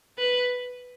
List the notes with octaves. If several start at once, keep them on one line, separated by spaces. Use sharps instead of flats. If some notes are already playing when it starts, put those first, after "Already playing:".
B4